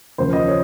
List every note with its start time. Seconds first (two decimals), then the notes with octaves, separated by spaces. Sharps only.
0.18 D#2 C#3 F3 C5
0.33 D#5
0.47 C#5